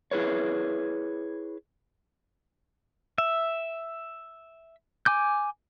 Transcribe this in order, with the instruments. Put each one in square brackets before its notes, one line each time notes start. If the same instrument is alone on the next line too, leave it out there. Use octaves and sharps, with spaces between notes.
[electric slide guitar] E4 G#4 B4 C#5
[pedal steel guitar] E5
G#5 D6 G6